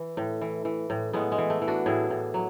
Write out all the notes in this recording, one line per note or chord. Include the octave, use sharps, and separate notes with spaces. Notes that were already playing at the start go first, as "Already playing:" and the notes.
Already playing: E3
A2
E3
E3
A2
A2 G#3 B3
G#3
E3
A3
E3
D4 F#4
A2 E4 G#4
A2
F#3